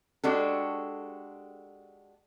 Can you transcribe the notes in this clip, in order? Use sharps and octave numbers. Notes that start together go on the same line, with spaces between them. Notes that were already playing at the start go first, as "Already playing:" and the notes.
G#3 D4 F#4 G4 A4